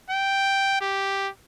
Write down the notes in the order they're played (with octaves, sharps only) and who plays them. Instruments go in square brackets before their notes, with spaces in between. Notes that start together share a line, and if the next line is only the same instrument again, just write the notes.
[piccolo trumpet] G5
G4